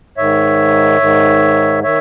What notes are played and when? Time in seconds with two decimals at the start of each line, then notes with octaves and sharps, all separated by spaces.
0.17 G#2 D#3 C#5 E5
1.01 G#2 D#3
1.83 D#3 C#5 E5